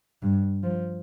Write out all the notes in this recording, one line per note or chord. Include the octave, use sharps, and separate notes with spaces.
G2
F3